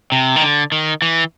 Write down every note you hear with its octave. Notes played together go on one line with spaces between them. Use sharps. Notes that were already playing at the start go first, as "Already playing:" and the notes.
C3
D#3
D3
D#3
E3